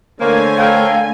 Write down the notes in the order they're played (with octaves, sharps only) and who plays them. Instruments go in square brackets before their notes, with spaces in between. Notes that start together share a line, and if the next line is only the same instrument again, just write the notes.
[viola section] D3 A3 G#5 [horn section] A#3 [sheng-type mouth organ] C5 C#5
[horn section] A4 A#4 G5 [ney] F5